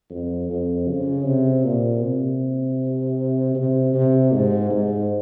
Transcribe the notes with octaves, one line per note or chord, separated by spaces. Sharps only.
F2
F2
C#3
C3
A#2
C3
C3
C3
G#2
G#2